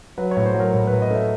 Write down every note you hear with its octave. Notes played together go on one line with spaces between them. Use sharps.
F#3 B4
C#5
A2
C5
F#3
A#4
A2
B4
A2
D#5
A3 E5